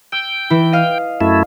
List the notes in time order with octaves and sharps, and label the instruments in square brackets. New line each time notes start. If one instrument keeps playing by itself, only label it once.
[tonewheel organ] G5 [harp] E6
[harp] E3 E4
D#5 F5
[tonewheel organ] F#2 A3 E4